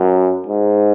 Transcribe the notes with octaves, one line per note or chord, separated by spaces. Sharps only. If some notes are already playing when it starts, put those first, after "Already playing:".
Already playing: F#2
G#2